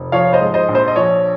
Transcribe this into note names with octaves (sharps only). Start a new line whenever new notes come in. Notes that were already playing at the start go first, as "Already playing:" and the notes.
Already playing: F1
F3 C#5 F5
C5 D#5
G#2
C5 D#5
A#1
C5
D#5
F3 C#5